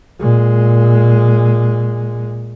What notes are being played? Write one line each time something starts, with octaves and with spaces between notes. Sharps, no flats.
A#2 G#3